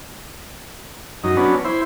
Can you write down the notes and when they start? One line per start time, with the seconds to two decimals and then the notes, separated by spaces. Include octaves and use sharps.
1.24 F#2 D#4
1.37 F#3 B3 C#4 D4
1.64 E4 C5